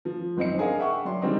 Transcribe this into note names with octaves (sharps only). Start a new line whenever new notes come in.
F3
F#1 C4 D#4 C#7
D4 G#4 A#4 D#5 F5
E5 F#5 G5 C#6
F#3 D5 C6
D3 D#3 G3 G#3 C4 D#4